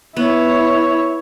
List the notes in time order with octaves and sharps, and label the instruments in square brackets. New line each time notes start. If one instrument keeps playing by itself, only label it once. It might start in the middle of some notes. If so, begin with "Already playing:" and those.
[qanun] B3 [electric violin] E4 C#5